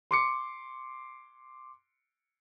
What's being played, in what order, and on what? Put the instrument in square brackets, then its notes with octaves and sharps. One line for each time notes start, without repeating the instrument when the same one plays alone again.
[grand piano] C6 D6 C#7